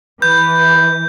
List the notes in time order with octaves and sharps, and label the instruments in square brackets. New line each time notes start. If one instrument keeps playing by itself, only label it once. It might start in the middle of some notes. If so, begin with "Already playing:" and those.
[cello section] E3 [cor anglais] B4 [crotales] G6